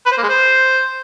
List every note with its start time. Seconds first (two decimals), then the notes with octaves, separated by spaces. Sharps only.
0.06 B4
0.12 C5
0.18 A#3
0.23 G#3
0.29 C5